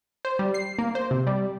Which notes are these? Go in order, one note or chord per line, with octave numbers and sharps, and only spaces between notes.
C5
G3
C7
A#3
C5
C3
G3